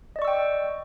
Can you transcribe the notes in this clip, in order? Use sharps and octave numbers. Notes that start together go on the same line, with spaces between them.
D5 D#5 G5 C#6 E6